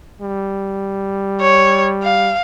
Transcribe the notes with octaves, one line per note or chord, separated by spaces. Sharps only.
G3
C#5
F5